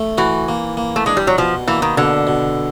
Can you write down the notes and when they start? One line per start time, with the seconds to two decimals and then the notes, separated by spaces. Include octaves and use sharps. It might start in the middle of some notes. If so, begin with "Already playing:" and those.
Already playing: A3
0.18 E3 F#4
0.48 A#3
0.77 A#3
0.96 A3
1.06 G#3 D4
1.17 G3
1.27 F#3
1.38 B2 F3
1.68 E3 A#3
1.82 D#3
1.97 B2 D3
2.27 B2